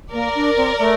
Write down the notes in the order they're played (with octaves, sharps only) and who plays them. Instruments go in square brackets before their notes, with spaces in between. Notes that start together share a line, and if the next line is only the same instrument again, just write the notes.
[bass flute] A#3 [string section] A#4 D5
[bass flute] D4
C4
A3